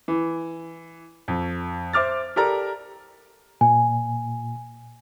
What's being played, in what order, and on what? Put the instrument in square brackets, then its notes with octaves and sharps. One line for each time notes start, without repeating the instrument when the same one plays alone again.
[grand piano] E3
F2
C5 E5 D6 F6 A6
G4 A4 A#4 D5 A#5
[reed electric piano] A#2 [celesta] G#5